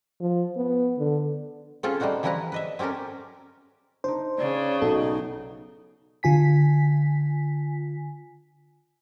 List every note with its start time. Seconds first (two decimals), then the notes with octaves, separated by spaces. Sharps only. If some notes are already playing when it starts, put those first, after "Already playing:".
0.20 F3
0.57 B3
0.99 D3
1.83 C4 C#4 F4 G#4 A4
2.00 G3 A3 D#4 F#4 C5
2.23 E3 F3 G3 E4 B4 A#5
2.52 B4 D#5 E5
2.79 C4 C#4 G4 A4 A#4
4.04 D4 D#4 C5
4.38 C#3 D5
4.82 B1 B2 F#3 D#4 A4
6.23 D3 F4 G#5 B6